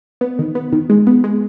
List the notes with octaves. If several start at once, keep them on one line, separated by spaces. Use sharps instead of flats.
B3
D#3
B3
D#3
G#3
B3
G#3